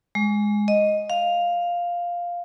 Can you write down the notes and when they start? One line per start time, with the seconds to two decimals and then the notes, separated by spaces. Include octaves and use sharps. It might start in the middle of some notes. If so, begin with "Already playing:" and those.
0.15 G#3
0.68 D#5
1.10 F5